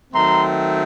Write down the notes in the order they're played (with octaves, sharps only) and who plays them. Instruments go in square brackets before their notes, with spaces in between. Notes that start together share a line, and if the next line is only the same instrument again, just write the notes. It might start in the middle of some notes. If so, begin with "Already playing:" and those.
[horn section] D#3 F#3 A3 C4 A#5 C6